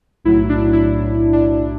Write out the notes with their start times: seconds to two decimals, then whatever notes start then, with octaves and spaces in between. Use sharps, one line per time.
0.25 B1 A2 F#3 E4
0.49 D4
0.73 E4
1.33 D4